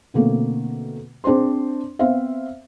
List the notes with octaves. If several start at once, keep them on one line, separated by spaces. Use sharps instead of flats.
B2 D3 A3 A#3 C4
C4 D4 G#4 C5 C6
B3 C4 C5 E5 F5